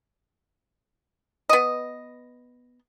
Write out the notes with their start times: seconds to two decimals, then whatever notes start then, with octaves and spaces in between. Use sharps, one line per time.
1.49 B3 D#5